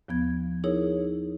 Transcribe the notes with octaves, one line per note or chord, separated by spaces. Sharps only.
D#2 F3 B3 G#6
D#4 E4 G#4 A#4 C#5